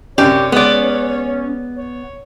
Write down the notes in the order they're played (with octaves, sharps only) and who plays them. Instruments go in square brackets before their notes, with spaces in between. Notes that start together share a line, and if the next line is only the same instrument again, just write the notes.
[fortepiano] F#2 C3 D4 [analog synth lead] C#4 [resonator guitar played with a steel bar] G4 [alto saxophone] C#5
[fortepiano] G#3 C6 [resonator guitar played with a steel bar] B3 D5
[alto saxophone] C#5